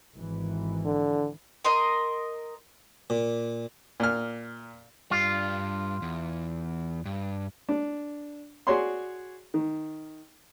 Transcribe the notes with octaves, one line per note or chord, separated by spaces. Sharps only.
G#1 E3
D3
A#4 D#5 C6
A#2
A#2 F6
G2 G3 F4
E2
G2
D4
F#4 G#4 C#5 D5 C6
D#3